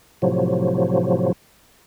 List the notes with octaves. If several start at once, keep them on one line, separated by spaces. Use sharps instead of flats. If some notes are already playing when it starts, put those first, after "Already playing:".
A2 C3 F3 F#3